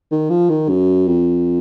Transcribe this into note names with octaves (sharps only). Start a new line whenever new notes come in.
D#3
F3
D#3
F#2
F2